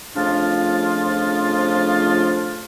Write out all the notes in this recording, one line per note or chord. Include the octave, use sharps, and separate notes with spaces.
F2 C#3 F3 A3 D4 F4